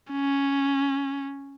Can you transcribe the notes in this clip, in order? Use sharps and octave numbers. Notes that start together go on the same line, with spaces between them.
C#4